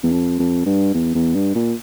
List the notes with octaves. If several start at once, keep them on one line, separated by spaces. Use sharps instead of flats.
E2
F2
F2
G2
E2
E2
G2
A#2